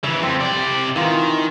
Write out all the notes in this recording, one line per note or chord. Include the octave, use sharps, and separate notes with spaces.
C#3 E3 E5
F2 C4
C3 D5
D#3 E3 F4